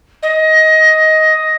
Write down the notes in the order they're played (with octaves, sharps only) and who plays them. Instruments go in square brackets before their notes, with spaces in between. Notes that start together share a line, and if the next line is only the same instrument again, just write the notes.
[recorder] D#5